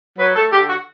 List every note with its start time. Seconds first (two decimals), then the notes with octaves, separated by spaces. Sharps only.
0.18 F#3 B4
0.35 A3 A4
0.53 D3 G4
0.69 F#4